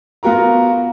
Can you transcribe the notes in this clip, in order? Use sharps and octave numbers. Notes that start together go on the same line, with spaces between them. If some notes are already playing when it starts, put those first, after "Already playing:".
B3 F4 F#4 A#4 A#5